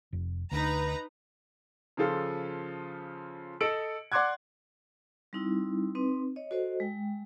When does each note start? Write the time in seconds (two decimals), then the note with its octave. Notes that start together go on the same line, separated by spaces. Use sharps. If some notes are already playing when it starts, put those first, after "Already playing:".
0.13 F1
0.51 D2 D4 D#4 B4 A#5
1.97 C#3 F3 F4 A4
3.61 A4 D#5 E6 C#7 D7 F#7
4.12 D5 F#5 C6 D6 F#6 G#6
5.33 G3 C4 D#4 E4
5.95 C4 D#4 B4
6.36 C#5 D#5
6.51 F#4 A4 C5 D#5
6.80 G#3 G5